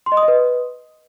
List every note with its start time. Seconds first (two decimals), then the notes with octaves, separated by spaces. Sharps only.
0.06 C6
0.12 D#5
0.17 D#6
0.23 D#5
0.28 B4